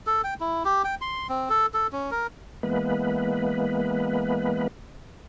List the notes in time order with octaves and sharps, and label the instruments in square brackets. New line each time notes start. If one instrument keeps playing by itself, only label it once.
[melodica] A4
G5
E4
G4
G5
C6
C4
A4
A4
C#4
A#4
[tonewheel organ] E3 G#3 A#3 B3 B4